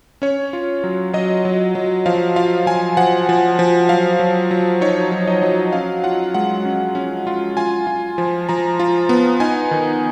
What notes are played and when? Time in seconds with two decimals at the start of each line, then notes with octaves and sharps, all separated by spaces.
0.22 C#4 C#5
0.53 F4
0.84 F#3
1.13 F#3 D#5
1.45 F#3
1.75 F#3
2.06 F3 F5
2.36 F4 F5
2.66 F3 G#5
2.97 F3 F#5
3.29 F3
3.59 F3
3.89 F#3 F5
4.19 F#3
4.51 F#3
4.81 D#4 C#5
5.12 F#3
5.27 D#5
5.42 F#3
5.73 C#4 F5
6.04 F4 F#5
6.34 G#3 F#5
6.65 C#4
6.95 C#4
7.27 F4
7.57 F4 G#5
7.87 F4
8.18 F3
8.49 F3 A#5
8.79 F4
9.09 B3
9.40 D#4 G#5
9.71 D#3